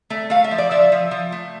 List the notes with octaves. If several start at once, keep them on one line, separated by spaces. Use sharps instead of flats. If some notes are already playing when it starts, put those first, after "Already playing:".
A3
A3 F5
E5
F3
D5
F3 E5
F3
F3
A3